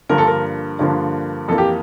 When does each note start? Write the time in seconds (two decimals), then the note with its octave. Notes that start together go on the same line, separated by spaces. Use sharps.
0.09 G2 D3 F3 A#3 A#4
0.18 A4
0.27 A#4
0.79 G2 D3 F3 A#3
1.48 F2 E3 A#3 A4
1.58 G4